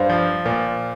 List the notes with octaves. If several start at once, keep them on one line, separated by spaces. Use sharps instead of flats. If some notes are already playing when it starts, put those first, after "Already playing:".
Already playing: G2 C5 F5
F3
A#2